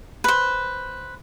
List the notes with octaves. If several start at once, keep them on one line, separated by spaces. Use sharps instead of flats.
B4 C5